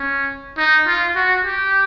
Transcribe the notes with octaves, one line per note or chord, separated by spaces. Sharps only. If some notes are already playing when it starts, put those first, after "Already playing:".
Already playing: C#4
D#4
F4
F#4
G4